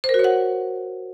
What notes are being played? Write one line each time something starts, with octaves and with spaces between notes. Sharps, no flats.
C5
A#4
F#4
C#5
F#5